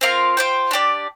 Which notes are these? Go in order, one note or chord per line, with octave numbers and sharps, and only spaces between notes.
C4 F4 A#4 F5
F4 C5 G5
D4 G4 D5